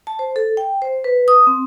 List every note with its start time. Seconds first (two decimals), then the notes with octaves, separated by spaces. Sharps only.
0.07 A5
0.19 C5
0.36 A4
0.57 G5
0.82 C5
1.04 B4
1.28 D#6
1.47 C4